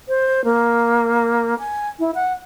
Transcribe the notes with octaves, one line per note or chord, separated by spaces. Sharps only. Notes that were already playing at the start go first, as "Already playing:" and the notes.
C5
A#3
G#5
E4
F#5